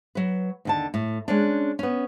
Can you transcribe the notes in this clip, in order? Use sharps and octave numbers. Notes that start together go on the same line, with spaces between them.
F#3 B4
D#2 D3 A5
A2
G#3 C#4 D4
B3 C#4